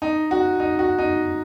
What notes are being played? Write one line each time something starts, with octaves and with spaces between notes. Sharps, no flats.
D#4
F#4
D#4
F#4
D#4